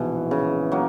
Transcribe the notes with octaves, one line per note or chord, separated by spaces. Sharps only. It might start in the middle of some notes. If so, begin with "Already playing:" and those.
Already playing: A#1 G#2 B2 E3
C#3
F#3 A#3